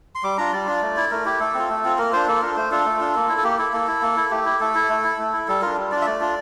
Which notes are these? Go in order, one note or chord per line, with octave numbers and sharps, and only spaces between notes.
C6
G3 D6
D4 F4 A#5
G3 D5
D4 F4
A3
E4
A3 A#4
E4 G4
A3 A4
C4 F4
A3
C4 F4
A#3 A#4
D4 F4 C5
A#3 A4
D4 F4 A#4
A3 C5
D4 F4 A4
A3
D4 F4
A#3
E4
A4
A#3 G4
E4 A4
A#3 A4
E4
A#3
E4
A3 G4
E4
A3 A4
E4
A3
E4
A3
E4
G3 A4
D4 F4 A#4
G3
D4 F4 D5
E5
A3 D5
D4 F4